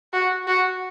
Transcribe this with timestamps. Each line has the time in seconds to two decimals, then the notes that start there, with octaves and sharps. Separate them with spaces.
0.13 F#4
0.47 F#4